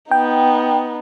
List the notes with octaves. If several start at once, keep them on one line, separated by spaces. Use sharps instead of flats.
B3 D#4 G5